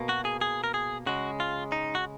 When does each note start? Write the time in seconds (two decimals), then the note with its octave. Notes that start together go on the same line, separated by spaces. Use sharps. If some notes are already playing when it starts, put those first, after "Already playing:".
Already playing: B2 A#3
0.09 F#4
0.25 G#4
0.41 G#4
0.64 A#4
0.74 G#4
1.06 C#3 G#3 F#4
1.40 F4
1.72 D#4
1.95 F#4